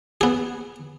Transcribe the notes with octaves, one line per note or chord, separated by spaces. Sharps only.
B3 G#4